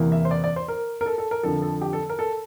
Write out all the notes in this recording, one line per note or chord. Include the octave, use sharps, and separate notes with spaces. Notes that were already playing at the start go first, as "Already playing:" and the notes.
Already playing: E2 C3 E3 A#3
E5
C5
D5
D5
C5
A#4
A#4
A4
A4
A#4
F2 D3 F3 A4
A4
G4
A4
A#4
A4